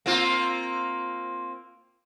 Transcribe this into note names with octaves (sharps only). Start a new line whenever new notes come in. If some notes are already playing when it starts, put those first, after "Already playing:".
A#3 C4 F4